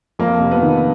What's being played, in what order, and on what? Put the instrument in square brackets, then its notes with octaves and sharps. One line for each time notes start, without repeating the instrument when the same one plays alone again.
[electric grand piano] F2 [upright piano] A#3
[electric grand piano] C3
[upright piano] B3
[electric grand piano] D#3